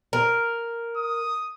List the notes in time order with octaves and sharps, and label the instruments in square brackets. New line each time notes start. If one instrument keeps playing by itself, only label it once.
[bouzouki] A#4
[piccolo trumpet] D#6